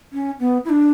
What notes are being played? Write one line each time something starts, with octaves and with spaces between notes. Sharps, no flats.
C#4
B3
E4
D4